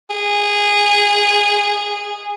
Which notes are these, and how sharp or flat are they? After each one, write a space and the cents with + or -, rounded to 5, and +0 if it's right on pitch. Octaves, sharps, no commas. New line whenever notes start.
G#4 -15